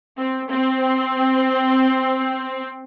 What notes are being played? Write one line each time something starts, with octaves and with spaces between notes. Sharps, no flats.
C4
C4